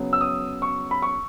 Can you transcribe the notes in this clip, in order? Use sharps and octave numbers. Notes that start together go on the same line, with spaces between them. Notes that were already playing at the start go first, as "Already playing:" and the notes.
Already playing: C#3 F#3 B3
E6
D#6
C#6
B5
C#6